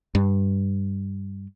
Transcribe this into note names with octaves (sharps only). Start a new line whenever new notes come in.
G2